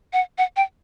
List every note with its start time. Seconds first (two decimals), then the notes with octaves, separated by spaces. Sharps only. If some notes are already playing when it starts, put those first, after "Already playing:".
0.13 F#5
0.38 F#5
0.56 G5